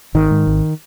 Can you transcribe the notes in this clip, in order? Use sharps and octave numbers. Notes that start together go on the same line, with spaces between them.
G#1 D#3
G#2
G#1